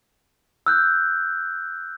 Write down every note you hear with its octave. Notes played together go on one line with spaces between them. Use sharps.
E6 F#6 G6